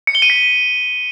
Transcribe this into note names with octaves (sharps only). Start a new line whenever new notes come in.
C#7
G7
D#7
B6